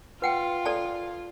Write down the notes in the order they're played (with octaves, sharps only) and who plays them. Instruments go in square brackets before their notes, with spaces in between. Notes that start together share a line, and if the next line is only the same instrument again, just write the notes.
[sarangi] F4 [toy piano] B4 F#5 G5
[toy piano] A4 D5 A5